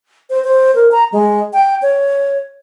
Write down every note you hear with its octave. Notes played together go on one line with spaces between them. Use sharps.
C5
C5
A#4
A#5
G#3
G5
C#5